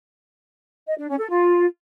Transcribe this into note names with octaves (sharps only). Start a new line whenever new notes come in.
D#5
D4
C#4
A4
F4